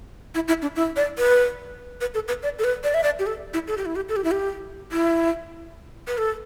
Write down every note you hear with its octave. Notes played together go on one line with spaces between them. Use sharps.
E4
E4
D4
E4
D5
B4
B4
A4
B4
D5
A4
B4
D5
E5
D5
G4
A4
E4
A4
G4
E4
G4
A4
G4
E4
G4
E4
B4
A4